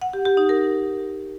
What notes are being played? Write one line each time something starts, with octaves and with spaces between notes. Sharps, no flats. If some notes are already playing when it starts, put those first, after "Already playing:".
F#5
G4
G4
D#4
A#4